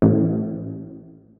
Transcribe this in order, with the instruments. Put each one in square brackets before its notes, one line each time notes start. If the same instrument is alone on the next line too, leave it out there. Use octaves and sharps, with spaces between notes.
[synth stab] A1